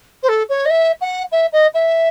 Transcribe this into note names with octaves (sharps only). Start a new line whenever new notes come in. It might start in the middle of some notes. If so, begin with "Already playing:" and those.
C5
A4
C#5
D#5
E5
F#5
E5
D#5
E5